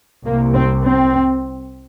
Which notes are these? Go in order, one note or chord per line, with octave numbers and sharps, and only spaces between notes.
C2 C3 A#3
C4
C4